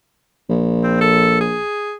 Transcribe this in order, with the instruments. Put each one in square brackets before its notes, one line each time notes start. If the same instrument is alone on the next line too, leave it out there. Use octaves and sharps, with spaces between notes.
[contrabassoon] A#1
[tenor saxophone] C4
A4
G#4